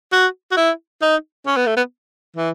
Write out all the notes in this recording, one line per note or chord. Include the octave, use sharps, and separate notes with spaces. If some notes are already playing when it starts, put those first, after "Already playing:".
F#4
F#4
E4
D#4
C#4
B3
A3
B3
E3